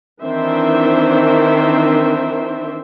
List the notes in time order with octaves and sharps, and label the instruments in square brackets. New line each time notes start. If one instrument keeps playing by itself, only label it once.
[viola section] D#3 E3 C4 D4 C5 E5